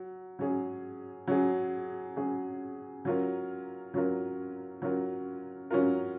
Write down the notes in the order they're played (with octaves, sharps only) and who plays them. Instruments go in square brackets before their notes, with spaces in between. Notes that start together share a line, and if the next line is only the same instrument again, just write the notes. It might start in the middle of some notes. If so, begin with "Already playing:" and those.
Already playing: [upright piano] F#3
F#3 C#4 G#4
F#3 C#4 G#4
F#3 C#4 G#4
F#3 C#4 F4 A#4
F#3 C#4 F4 A#4
F#3 C#4 F4 A#4
F#3 C#4 F4 A#4